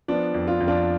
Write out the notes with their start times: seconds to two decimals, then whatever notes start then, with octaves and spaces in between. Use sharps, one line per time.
0.08 F3 B3 D4
0.34 F2
0.47 D4 F4
0.60 F2
0.68 D4 F4